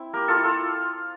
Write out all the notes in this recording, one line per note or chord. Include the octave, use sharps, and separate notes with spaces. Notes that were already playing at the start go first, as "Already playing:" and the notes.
Already playing: C4 E4
A#3 G4 A#4
F4 A4
E4
F4 A4